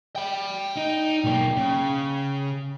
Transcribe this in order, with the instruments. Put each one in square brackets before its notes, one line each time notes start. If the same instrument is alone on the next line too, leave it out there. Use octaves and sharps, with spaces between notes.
[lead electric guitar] G5 B5
[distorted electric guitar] D#4
B1 A#3
C#3